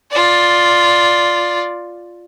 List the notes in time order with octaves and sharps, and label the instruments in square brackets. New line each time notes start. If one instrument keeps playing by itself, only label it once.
[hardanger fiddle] F4 D5